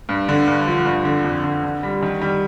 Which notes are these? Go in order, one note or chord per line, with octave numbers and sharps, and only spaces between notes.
G2
D3
G2
F3
G2
D3
F2
D3
D3
G3
D#3
G3